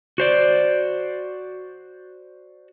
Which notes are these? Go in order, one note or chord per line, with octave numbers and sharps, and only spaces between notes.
F#4 C5 D5